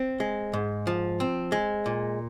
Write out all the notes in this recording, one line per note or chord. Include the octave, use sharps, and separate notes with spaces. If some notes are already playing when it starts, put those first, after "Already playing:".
Already playing: C4
G#3
G#2
F3
C4
G#3
A#2